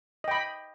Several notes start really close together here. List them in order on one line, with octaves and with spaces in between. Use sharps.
D#5 G5 B5